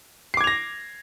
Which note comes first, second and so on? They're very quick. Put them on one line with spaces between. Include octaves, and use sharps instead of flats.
C7 D6 G#6 F7 A#6